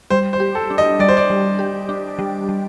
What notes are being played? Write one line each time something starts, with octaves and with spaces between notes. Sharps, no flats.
G3 C5
C5
G4
A4
D4
D#5
G3 D5
C5
D5
G3
G4
D4
G3
G3